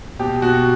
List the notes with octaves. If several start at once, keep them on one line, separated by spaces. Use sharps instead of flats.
B2 G4
B2 F#4